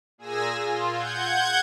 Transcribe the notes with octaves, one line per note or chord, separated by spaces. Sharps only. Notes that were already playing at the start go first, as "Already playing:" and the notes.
A#2 G#4 G#5 E6 A#6
F4
F#5 G6 G#6